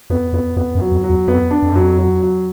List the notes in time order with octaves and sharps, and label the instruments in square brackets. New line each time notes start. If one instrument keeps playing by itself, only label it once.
[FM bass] F2 [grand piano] B3
[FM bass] F2 [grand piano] B3
[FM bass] F2 [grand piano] B3
[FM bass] F#2
[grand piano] F#3
[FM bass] F2
[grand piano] F#3
[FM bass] E2
[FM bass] F2 [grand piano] B3
[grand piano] D4
[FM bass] F2
[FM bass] F#2 [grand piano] F#3
[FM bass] F2
[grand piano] F#3
F#3